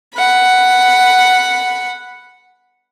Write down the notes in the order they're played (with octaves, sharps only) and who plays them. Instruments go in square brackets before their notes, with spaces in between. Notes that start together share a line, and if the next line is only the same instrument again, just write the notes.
[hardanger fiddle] F#5 B5